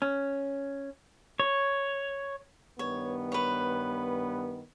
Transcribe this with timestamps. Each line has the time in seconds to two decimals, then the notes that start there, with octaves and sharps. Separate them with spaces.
0.02 C#4
1.40 C#5
2.79 G2 D#3 B3 C#5
3.32 B4 C#5